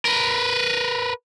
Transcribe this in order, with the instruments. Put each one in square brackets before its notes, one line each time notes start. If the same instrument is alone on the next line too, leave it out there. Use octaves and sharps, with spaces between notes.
[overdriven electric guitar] A#4 B4